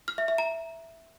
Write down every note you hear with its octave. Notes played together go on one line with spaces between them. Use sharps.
F6
E5
E5
A#5